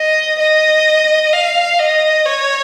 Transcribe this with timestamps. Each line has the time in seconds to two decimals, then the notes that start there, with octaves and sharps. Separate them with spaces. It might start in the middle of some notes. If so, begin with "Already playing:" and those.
Already playing: D#5
0.39 D#5
1.33 F5
1.79 D#5
2.26 C#5